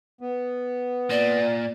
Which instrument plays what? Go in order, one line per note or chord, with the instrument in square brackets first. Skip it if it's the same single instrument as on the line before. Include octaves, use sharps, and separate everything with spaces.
[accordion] B3
[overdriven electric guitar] A#2 [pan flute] D5